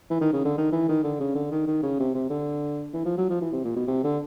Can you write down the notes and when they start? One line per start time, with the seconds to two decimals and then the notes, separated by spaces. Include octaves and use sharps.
0.10 E3
0.21 D#3
0.33 C#3
0.45 D3
0.58 D#3
0.72 E3
0.89 D#3
1.04 D3
1.21 C#3
1.35 D3
1.51 D#3
1.67 D#3
1.83 C#3
2.00 C3
2.15 C3
2.30 D3
2.94 E3
3.05 F3
3.18 F#3
3.30 F3
3.41 E3
3.53 C3
3.64 A#2
3.76 B2
3.88 C3
4.04 D3